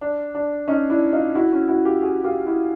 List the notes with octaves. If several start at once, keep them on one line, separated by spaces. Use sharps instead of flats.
D4
D4
C#4 D#4
D4 E4
D#4 F4
E4 F#4
C#4
E4 F#4
F4 G4
F#4 G#4
F4 G4
E4 F#4